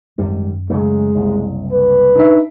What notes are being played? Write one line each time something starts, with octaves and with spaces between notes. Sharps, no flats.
G#1 F#2 G3
C#3 F#3 G#3 A3
F#1 C2
B4
D4 D#4 E5